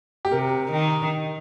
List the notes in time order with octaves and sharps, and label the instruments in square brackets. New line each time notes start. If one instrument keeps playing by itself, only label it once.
[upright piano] G4
[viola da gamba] C3 [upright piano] A#4
[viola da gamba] D#3